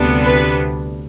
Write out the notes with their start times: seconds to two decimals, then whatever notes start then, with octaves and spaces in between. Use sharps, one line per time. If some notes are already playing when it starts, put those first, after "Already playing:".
Already playing: D2 C3 G3 B3 D4
0.22 B4